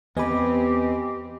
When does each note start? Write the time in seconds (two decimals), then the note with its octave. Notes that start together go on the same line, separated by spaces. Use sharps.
0.17 E2 B3 C4 G4 B4 D#5 G#5